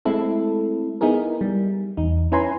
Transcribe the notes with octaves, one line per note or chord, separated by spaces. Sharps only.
G#3 A3 C4 E4 A4
B3 D#4 E4 G#4 A#4
G3
E2 D#4
C#4 E4 B4 G#5 A#5 C6